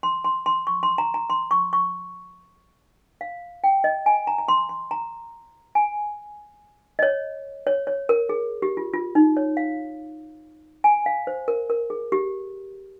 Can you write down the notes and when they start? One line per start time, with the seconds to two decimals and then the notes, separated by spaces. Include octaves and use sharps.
0.03 C6
0.24 C6
0.46 C6
0.67 C#6
0.83 C6
0.98 A#5
1.14 A#5
1.30 C6
1.51 C#6
1.73 C#6
3.21 F5
3.64 G5
3.84 D#5
4.06 G#5
4.27 A#5
4.38 A#5
4.48 C6
4.69 C6
4.91 A#5
5.75 G#5
6.99 D#5
7.03 C#5
7.67 C#5
7.87 C#5
8.09 A#4
8.29 G#4
8.62 G4
8.77 F4
8.94 F4
9.15 D#4
9.37 C#5
9.57 F5
10.84 G#5
11.06 F5
11.27 C5
11.48 A#4
11.70 A#4
11.90 G#4
12.12 G4